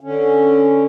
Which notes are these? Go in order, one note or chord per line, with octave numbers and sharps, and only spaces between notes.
D3 C#4